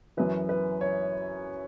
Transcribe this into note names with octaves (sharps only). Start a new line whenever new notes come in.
F#2 E3 B4
B4
C#5